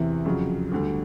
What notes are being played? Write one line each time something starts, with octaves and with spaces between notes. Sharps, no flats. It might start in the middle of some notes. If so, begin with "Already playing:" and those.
Already playing: E2 C3 E3
F2 C#3 F#3
D2 D3 G3